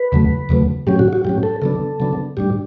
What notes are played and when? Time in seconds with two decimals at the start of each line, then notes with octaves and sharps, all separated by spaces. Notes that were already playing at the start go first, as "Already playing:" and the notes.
Already playing: B4
0.12 E2 C#3 F#3 A3
0.49 E2 C#3 F#3 A3
0.87 A2 F#3 C#4 G4
0.99 F#4
1.13 F#4
1.25 A2 F#3 C#4 G4
1.43 A4
1.62 C#3 F#3 B3 D4 A4
2.00 C#3 F#3 B3 D4
2.37 A2 G3 D4 G4